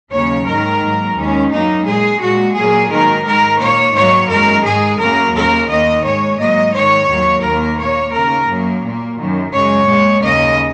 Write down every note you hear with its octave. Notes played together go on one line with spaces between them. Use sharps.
D#2 C#3 F#3 A#3 C#5
G#2 D#3 G#3 A#4
G#2 F#3 A#3
D#2 D#3 G#3 C#4
F#2 F#3 A#3 D#4
A#2 G#3 G#4
A#2 G#3 F#4
A#2 F#3 A#3 G#4
G#2 D#3 F#3 A#3 A#4
G#2 D#3 G#3 A#4
A#2 A#3 C#5
G#2 D#3 F#3 A#3 C#5
F#2 D#3 G#3 A#4
G#2 G#3 G#4
F#2 C#3 F#3 A#3 A#4
D#2 C#3 A#3 A#4
D#2 D#3 A#3 D#5
G#2 G#3 C#5
G#2 F#3 A#3 D#5
G#2 D#3 G#3 C#5
D#2 D#3 F#3 A#3
D#2 D#3 A#3 A#4
A#2 A#3 C#5
D#2 C#3 A#3 A#4
F#2 F#3 A#3
A#2 A#3
F#2 D#3 F#3
F#2 C#3 G#3 C#5
A#2 G#3
D#2 C#3 A#3 D#5